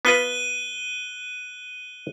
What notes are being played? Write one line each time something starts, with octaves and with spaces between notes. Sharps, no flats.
B3 F4 B4 F#6 D#7 G7